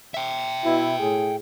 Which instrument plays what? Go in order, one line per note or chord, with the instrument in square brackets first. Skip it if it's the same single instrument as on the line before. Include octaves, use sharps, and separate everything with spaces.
[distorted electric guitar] E5 G5
[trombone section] B2 E4
A2 G#4